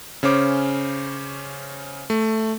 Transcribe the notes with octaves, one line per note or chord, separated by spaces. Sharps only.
C#3 C#4 C5 D6
A3